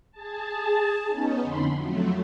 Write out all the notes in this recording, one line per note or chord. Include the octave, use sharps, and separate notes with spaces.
G#4 A5
B3 C#4 D#4
F2 D3 B5 C6
F2 F#3 A3